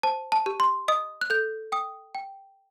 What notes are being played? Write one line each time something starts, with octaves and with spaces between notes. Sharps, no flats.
C5 A5
A5
G4
C6
D#5 D#6
F#6
A4 G6
G5 D#6
G5